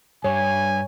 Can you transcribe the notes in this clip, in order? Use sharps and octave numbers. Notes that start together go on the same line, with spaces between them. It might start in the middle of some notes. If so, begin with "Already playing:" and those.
G2 C#5 G#5